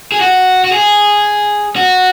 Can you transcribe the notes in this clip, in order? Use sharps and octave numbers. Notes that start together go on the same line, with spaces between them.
G#4
F#4
F#4
G#4
F#4